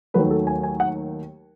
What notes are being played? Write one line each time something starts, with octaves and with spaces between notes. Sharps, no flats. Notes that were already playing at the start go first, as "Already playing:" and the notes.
D#2 D#3 F#3 A3 B4
A4
G#5
G#5
F#5